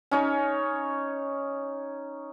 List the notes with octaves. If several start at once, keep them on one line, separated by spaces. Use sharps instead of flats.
C#4 D#4 C#5